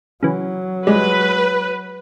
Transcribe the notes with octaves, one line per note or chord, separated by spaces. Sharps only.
C#3 E3 F#3
G3 G#3 B4